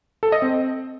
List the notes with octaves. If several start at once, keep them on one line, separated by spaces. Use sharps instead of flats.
A4
D#5
C4